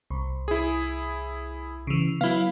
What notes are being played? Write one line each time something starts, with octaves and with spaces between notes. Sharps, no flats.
C2
E4 G#4
C#3 E3
F#3 B3 E4 F5